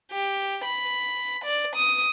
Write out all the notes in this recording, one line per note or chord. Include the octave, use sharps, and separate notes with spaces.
G4
B5
D5
D#6